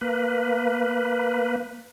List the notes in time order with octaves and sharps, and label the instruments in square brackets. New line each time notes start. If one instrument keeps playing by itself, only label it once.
[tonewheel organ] A#3 B4